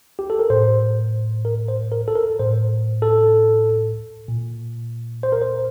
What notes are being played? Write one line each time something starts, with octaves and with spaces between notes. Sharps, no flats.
G4
A4
A#4
A2 C5
A#4
C5
A#4
A4
A#4
A2 C5
A4
A#2
C5
A#4
C5